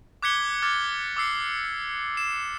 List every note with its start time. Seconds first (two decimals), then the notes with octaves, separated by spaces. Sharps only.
0.22 D6 F#6 G#6 B6 C#7 G7
0.62 D6 F6 G#6 A6
1.17 D6 E6 C7 C#7
2.17 C7 E7